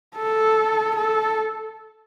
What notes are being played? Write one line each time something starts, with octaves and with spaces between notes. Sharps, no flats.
A4
A4